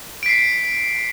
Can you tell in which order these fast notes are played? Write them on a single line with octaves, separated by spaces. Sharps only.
D7 B6 C7